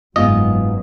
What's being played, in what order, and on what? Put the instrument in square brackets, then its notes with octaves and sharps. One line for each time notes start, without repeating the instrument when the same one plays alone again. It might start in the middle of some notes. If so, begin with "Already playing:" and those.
[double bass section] F#1 F#3 [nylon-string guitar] G#2 B3 F4 [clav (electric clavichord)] D#5